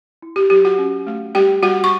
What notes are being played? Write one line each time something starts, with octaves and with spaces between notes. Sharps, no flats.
E4
G4
F#3 G4
F#4 F#5
C#4
A3
G3 G4 G5
G3 F#4 F#5
C#6